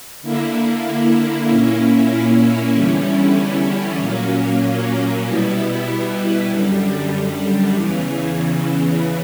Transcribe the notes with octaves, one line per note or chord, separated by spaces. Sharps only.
D3 A#3 E4
A#2 A#3 C#4 E4
E2 D3 G3 C#4 E4
A#2 F#3 A#3 C#4
B2 G3 B3 E4
F#2 D3 G3
E2 C#3 E3